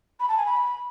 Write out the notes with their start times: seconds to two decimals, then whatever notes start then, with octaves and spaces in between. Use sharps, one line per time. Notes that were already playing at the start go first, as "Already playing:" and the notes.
0.20 B5
0.28 A5
0.37 G#5
0.46 B5